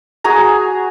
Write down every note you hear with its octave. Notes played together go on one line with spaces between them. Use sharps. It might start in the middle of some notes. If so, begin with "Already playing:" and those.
F#4 G#4 G#5 A#5